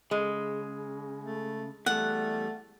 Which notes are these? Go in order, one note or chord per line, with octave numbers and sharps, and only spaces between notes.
C#3 G#3
A3
E2 G3 A3 F#5